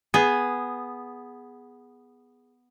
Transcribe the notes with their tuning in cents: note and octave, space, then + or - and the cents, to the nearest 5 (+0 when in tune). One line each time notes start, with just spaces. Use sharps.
B3 +0 G#4 +0